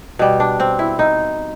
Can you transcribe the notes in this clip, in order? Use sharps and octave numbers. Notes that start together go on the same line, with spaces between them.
B2 G3
D4
C4
E4
D#4